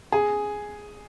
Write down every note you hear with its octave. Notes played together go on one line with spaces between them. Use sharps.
G#4